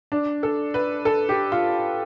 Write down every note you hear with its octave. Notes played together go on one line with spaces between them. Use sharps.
D4
A4
B4
A4
G4
F4